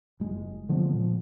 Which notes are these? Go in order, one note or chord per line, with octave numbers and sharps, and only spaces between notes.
F#1 G#3
D3 F3 G#3 B3
A#2 F3 B3